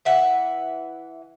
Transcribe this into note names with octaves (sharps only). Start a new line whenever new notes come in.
E3 E5 F#5